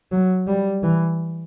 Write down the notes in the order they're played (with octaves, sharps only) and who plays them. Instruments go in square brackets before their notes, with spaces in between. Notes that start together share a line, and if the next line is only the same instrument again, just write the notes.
[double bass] F#3
G3
E3